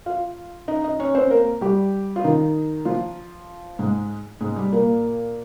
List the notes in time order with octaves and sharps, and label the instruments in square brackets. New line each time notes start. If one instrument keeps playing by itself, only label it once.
[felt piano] F4 F5
D#4 D#5
D#4 D#5
C#4 C#5
C4 C5
A#3 A#4
G3 G4
F4
D#3 D#4
F3 F4
G#2 G#3
G#2 G#3
G3
A#2 A#3